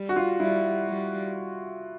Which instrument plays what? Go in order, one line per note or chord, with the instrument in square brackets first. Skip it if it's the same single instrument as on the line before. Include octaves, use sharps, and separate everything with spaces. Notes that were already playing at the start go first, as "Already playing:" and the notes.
Already playing: [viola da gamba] G3
[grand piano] F#4
F4
[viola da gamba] G3 [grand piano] E4
[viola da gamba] G3